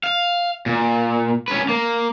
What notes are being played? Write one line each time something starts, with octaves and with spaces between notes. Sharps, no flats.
F5
A#2
C#4 B4
A#3